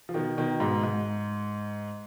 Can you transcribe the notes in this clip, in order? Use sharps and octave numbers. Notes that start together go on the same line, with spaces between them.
F3
B2 D#3
B2 D#3
G#2 B2
G#2